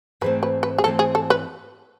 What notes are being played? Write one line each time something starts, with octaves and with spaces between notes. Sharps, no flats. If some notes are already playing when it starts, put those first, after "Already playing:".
G#2 E3 A3 C4 B4
B4
B4
G#4
G#2 E3 A3 C4 A4
G#4
A4
B4